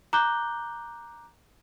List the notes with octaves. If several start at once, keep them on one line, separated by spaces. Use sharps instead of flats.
A#5 D6 F#6 G6 G7